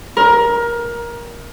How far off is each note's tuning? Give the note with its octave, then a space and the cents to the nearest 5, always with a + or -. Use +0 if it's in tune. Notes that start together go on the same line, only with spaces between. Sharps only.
A#4 +20